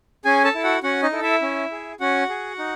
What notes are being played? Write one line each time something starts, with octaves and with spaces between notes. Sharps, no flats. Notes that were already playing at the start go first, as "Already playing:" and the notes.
C#4 G#4 G#5
A4 A5
E4 A4
F#4 F#5
C#4 F#4 F#5
D#4 D#5
E4 A4
E4 E5
C#4
G#4
C#4 F#4 F#5
G#4
D#4